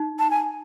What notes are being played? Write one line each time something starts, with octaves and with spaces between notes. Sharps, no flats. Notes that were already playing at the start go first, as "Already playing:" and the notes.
Already playing: D#4
A5
G#5